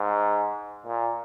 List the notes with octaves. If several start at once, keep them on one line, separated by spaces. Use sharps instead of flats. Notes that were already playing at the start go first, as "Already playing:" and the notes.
Already playing: G#2
A#2